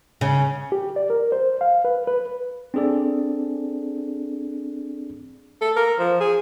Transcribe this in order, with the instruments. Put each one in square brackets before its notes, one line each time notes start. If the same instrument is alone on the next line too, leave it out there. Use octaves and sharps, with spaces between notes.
[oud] C#3
[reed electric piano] G4
D5
A#4
C5
F5
B4
B4
[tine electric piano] C4 D4 G#4 A4 D5
[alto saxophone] A4
A#4
F3
G#4